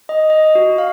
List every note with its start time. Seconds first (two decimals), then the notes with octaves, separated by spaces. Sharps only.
0.09 D#5
0.30 D#5
0.55 F#4
0.78 F5